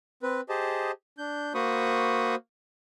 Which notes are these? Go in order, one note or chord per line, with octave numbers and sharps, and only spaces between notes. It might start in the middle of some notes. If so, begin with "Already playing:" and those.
C4 B4
G4 G#4 C5 D#5 A5
D4 G6
A#3 F#4 C5 B5 C#6 D#6